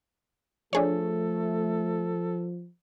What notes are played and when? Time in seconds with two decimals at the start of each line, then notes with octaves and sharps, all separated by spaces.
0.73 F3 A3 D4 G#4 A4 C#5